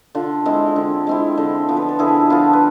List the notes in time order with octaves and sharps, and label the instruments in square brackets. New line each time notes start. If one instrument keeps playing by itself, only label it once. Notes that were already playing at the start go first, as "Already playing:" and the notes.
[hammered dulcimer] D3 F4
G#3 C4 E4
D3
G#3 C4 E4
D3
F3 B3
B4
A4
D3 E4 G#4
F3 B3 F4 A4
B4